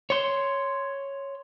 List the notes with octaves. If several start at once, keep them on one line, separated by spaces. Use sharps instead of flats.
C#5 C6